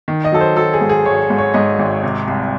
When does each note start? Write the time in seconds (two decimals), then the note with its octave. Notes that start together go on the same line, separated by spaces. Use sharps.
0.08 D#3
0.24 D#5
0.32 F#3 A4
0.41 C5
0.57 F#3 A4
0.74 G#4
0.81 G#2
0.89 G#4
1.06 G#1 C#5
1.30 G#2
1.38 C#5
1.54 G#2 D#5
1.79 G#1
2.03 C3
2.27 C2